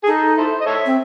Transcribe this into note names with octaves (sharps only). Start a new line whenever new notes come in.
G#4
D#4 A4
E4 A4 C5
D#5
A4 C#5 E5
C4